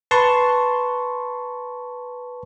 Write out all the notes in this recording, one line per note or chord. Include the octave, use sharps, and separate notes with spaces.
B4 A5 C6 C#6